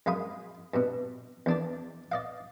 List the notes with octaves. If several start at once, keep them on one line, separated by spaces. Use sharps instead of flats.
F#2 G#3 F5 B5 D#6
G2 B2
E2 D4 D5
D5 D#5 F5